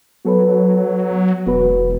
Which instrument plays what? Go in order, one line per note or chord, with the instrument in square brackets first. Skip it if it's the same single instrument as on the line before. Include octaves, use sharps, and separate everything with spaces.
[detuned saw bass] F#3 [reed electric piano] B3 A4 B4
[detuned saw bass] E1 [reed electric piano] B3 F#4 B4